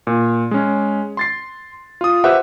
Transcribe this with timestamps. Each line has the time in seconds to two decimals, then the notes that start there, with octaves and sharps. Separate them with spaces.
0.07 A#2
0.51 G#3 C#4
1.17 C6 A6 C7
2.01 F4 D#6
2.24 G4 B4 C5 E5 F#5